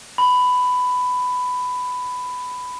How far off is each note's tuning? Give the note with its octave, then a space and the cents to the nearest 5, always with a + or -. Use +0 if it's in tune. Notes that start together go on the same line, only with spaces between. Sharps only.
B5 +15